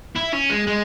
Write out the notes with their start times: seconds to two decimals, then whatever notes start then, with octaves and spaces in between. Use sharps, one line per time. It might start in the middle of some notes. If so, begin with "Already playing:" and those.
0.16 E4
0.33 C#4
0.50 G#3
0.67 G#3